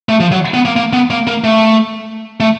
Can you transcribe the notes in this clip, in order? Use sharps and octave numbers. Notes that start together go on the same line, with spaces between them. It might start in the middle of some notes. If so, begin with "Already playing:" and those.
A3
F3
F#3
B3
A#3
A#3
B3
A#3
A#3
A3
A3